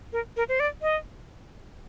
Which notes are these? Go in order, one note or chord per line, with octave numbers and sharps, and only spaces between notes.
A#4
A#4
C5
D5
D#5